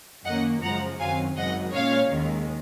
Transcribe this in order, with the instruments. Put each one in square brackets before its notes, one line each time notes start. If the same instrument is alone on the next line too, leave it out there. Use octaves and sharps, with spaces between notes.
[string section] F#2 D#3 A#3 C#4 D#5 F#5
F#2 C#3 F3 G#3 F#5 A#5
F#2 D#3 F#3 C4 F5 G#5
G#1 F#2 C#3 F#3 D#5 F#5
A#2 G#3 C#4 C#5 F5
D#2 D#3 G#3